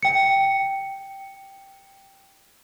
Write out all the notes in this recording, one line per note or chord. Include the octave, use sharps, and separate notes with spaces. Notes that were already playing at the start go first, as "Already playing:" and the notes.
G5 C#7